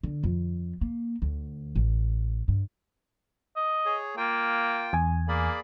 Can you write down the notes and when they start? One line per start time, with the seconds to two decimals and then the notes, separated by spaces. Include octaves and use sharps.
0.03 D3
0.24 F2
0.81 A#3
1.22 D2
1.75 A1
2.48 G2
3.56 D#5
3.85 G#4 C#5
4.17 A#3 F4 G5
4.93 E2 G#5
5.28 A#3 G#4 D5 B5